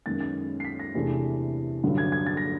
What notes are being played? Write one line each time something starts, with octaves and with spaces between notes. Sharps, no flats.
F#2 D#3 G#3 B3 A6
A6
C7
B6
A#6
E2 C3 E3 A3 D4
G2 D3 F#3
G#6
G#6
A6
A#6